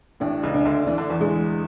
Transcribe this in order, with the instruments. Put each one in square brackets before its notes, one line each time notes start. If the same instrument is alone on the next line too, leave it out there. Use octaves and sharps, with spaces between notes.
[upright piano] A1 A2 [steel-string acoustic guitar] D4
[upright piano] C#2 C#3
[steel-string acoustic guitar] D4
[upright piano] D2 D3
[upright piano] E3 [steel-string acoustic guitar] D4
[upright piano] D3
E2 E3
[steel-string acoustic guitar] G#3